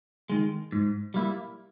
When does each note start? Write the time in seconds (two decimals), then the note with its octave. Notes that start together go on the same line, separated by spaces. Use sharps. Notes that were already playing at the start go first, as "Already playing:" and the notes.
0.30 D#3 G#3
0.72 G#2
1.14 G3 A#3 E4